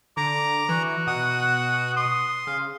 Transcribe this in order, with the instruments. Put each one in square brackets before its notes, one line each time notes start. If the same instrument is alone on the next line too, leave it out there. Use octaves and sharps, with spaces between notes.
[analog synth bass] D3 [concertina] A#5 [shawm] D6
[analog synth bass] E3 [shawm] F#4
[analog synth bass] B2 [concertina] F#5 D#6
[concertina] C6 [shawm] D#6
[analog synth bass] C#3 [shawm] F5